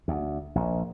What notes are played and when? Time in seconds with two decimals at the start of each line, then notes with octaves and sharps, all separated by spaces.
0.08 D2
0.55 A#1